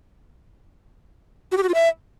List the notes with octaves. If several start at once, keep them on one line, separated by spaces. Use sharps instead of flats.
F#4
G4
F#4
F4
E5